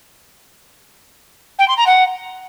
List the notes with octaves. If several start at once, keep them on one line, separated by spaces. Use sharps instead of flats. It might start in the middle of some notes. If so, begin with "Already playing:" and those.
G5
C6
A#5
F#5